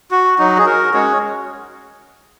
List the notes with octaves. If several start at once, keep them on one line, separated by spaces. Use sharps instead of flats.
F#4
F#3 D#4 F#4
G#4
F#4 A#4
G#3 C#4 F#4 G#4 C#5